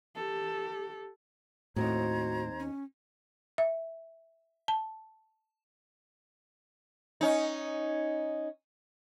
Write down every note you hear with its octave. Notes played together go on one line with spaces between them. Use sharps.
G4 A4
D#2 A2 C4 D#4 F#4 C5 A#5 G#6
C#4
E5
A5
C#4 D#4